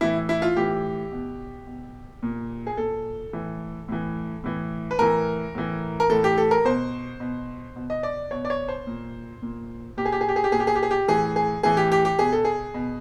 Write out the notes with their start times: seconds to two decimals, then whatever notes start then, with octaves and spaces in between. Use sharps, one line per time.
0.01 A2 E3 E4
0.29 E4
0.42 F4
0.56 A2 E3 G4
1.12 B2
1.67 B2
2.22 A#2
2.67 G#4
2.77 A#2 A4
3.33 A2 E3
3.88 A2 E3
4.44 A2 E3
4.91 B4
4.99 A2 E3 A#4
5.55 A2 E3
6.00 A#4
6.09 A2 E3 A4
6.24 G4
6.38 A4
6.51 A#4
6.65 B2 C5
7.20 B2
7.76 B2
7.90 D#5
8.03 D5
8.31 B2 C#5
8.45 D5
8.50 C#5
8.68 C5
8.87 A#2
9.42 A#2
9.97 A#2 G4
10.05 G#4
10.12 G4
10.21 G#4
10.29 G4
10.36 G#4
10.44 G4
10.52 A#2 G#4
10.60 G4
10.67 G#4
10.75 G4
10.83 G#4
10.91 G4
11.08 A2 E3 G#4
11.36 G#4
11.63 A2 E3 G#4
11.77 G4
11.92 G4
12.05 G4
12.19 B2 G#4
12.33 A4
12.45 G#4
12.74 B2